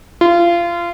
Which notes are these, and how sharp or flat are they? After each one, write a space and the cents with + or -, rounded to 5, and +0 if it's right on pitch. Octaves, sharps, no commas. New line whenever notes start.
F4 -25